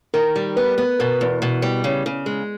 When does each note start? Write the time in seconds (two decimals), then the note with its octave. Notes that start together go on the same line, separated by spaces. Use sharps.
0.14 D#3 A#4
0.36 G3
0.56 B3 B4
0.78 B3
0.99 B2 A#4
1.21 E2
1.42 B2
1.62 G3
1.84 C#3
2.06 C#3
2.26 G#3